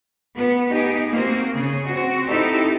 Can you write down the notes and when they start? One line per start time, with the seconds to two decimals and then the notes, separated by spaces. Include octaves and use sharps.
0.36 B3
0.69 B3 D#4 G4 G#4
1.11 A#3 C4 F#4
1.54 C#3 G#4
1.87 C4 F#4
2.26 C4 D#4 E4 G4 A4